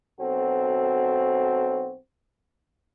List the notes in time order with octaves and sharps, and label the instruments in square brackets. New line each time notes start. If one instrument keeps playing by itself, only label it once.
[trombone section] B1 C4 F#4 A4